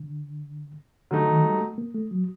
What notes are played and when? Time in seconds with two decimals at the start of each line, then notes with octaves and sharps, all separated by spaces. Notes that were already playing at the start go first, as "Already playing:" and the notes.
Already playing: D3
1.11 D3 F#3 A3 D#4
1.28 D#3
1.44 G3
1.61 A3
1.78 A#3
1.94 A3
2.11 F#3